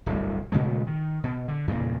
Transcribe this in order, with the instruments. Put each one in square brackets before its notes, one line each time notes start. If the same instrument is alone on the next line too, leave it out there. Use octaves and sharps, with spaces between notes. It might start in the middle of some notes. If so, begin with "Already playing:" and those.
[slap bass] D1 G1 C2
A#2 C#3 G#3 A3
D#3
B2
D3
E2 G2 A#2 C#3